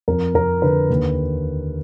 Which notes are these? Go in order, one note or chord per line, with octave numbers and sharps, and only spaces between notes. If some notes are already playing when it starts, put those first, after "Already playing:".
F2 A#4
F2 A#4
D3 B4
D#2